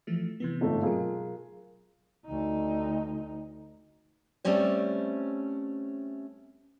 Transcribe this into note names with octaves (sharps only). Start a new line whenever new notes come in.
E3 F3 A3
C3 E3 B3
G1 G#2 A3
B2 F#3 F4 G#4 A#4
D2 D#4
G3 A3 C4 C#4 C5